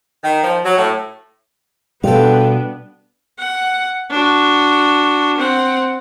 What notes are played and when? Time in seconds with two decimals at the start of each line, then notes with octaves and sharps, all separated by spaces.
0.24 D#3
0.44 F3
0.65 F#3
0.78 A2
2.04 B2 G3 B3 D4 F4 A4 G5
3.39 F#5
4.11 D4 F#4
5.38 C4 F#5